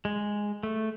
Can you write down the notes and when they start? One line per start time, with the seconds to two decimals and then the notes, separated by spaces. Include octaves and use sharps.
0.05 G#3
0.63 A3